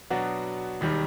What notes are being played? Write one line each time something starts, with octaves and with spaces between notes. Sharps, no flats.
B2 F#3 B3 D4 F#4
E1 D#2 D#3 G3